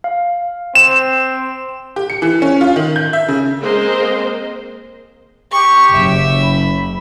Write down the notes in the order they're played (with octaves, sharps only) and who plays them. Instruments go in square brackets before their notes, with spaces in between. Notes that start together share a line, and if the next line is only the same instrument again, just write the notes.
[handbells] F5
[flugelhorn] C4 [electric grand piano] E7
[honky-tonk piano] G4
C#7
E3
C#4
F4
D#3
G6
E5
C#3
[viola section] G#3 A#3 C4 A#4 C5 D#5
[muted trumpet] G4 [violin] C#6
[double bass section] F#1 [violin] E5
[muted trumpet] B5